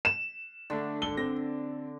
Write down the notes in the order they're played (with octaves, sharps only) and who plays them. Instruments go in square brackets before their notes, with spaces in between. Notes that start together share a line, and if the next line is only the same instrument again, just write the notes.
[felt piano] E7
[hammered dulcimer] D3 [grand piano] A3 D4
[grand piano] G#1 A4 [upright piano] G7
[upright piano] C4 [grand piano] A#6